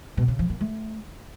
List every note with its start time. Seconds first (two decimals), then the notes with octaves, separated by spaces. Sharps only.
0.17 B2
0.28 C#3
0.39 F3
0.50 A#3
0.61 A3